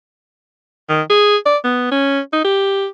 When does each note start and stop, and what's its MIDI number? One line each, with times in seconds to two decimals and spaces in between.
0.89 1.02 51
1.10 1.36 68
1.46 1.57 74
1.64 1.91 59
1.91 2.20 61
2.33 2.44 63
2.44 2.87 67